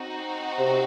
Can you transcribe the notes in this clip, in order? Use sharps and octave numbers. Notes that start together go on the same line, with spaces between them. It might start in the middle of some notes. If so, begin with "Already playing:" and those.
Already playing: C4 D#4 F#4
C3